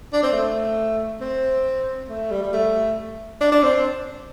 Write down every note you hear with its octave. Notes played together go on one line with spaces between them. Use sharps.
D4
C4
A3
C4
A3
G3
G3
A3
D4
D4
C4